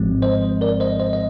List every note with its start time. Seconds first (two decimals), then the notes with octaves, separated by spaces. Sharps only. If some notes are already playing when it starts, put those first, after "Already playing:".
Already playing: G#1 G#2 F3 G#3 C4
0.22 C5 D#5
0.61 A#4 D5
0.80 C5 D#5
1.00 C5 D#5
1.13 D#5